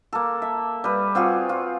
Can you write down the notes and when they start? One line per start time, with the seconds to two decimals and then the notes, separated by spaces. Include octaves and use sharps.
0.13 A#3 A4
0.42 E5
0.84 G3 B4
1.15 C4 F4 F#4 G#4
1.49 F4